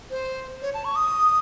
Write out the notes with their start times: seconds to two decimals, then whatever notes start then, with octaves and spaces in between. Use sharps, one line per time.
0.10 C5
0.62 C#5
0.74 A5
0.85 C#6
0.96 D#6